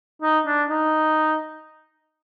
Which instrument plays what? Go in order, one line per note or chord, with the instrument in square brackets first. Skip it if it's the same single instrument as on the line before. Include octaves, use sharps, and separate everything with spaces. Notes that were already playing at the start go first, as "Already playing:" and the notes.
[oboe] D#4
D4
D#4